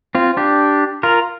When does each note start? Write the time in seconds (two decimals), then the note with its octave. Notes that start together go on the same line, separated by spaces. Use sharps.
0.15 C4 F4
0.37 D4 G4
1.03 F4 A#4